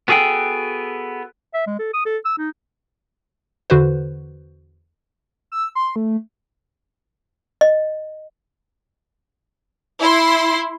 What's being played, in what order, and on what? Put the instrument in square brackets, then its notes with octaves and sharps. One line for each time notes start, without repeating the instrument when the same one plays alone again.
[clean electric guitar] B3 F#4 G#4 A4 G5
[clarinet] E5
G#3
A4
D#6
A4
E6
D#4
[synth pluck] E2 D3 F#4 B4 C5
[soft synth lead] E6
C6
A3
[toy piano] D#5
[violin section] E4 C6